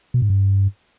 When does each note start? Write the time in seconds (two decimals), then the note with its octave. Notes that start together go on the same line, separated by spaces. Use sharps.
0.14 B2
0.22 G#2
0.30 G2